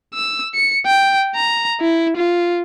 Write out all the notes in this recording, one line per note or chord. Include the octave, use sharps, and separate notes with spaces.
E6
C#7
G5
A#5
E4
F4